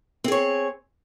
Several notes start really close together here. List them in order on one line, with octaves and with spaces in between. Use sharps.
C4 G#4 C#5